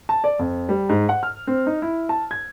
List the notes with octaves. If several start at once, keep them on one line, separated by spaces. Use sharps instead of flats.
A5
D5
F2
G3
G#2
F#5
F6
C4
D#4
E4
A5
G#6